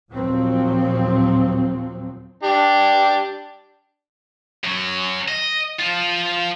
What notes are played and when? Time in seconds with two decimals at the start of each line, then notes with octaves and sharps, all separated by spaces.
0.12 D#2 A#2 F3 F#3 C4
2.43 D4 G4
4.64 F#2 F#3
5.28 D#5
5.80 F3 F4